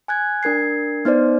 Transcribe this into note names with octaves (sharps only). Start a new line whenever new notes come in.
G#5 F#6 G#6
D4 A#4 G#6 C7
B3 D#4 C5 D5